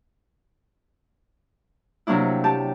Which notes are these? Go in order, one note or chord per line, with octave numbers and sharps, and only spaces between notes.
C3 F#3 A#3 D4 E4
G4 A5